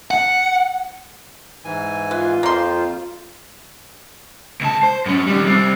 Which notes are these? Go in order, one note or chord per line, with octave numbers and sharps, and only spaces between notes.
F#5
G#2 E3 G#5
F4 B4
F2 A#3 C5 C6
C#2 A5
C5
F#2 C#4
D#3 G3
G3 C4